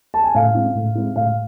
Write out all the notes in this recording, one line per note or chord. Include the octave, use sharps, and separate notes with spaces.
A5
G#5
A2 F5
G#3 C4 E4
A2
G#3 C4 E4
A2 F5